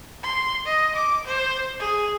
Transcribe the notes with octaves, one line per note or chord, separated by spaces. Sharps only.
C6
D#5
D6
C5
G#4